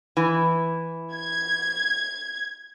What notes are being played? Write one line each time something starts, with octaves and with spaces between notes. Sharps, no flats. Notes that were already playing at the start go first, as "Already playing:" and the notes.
E3
G#6